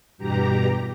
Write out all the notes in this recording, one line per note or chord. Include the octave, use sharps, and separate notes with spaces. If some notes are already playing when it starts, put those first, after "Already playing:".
E2 G2 B2 G4 A#5